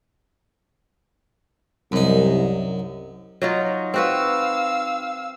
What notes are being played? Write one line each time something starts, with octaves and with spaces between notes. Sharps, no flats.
C2 F#2 D#4
F#3 D#4 F4
C4 F#4 B4 F5 E6